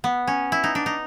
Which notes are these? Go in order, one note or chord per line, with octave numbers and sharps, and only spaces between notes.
B3
C#4
E4
D#4
D4
D#4